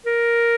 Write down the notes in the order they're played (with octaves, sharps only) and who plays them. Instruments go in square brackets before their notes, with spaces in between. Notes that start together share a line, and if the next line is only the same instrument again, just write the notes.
[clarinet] A#4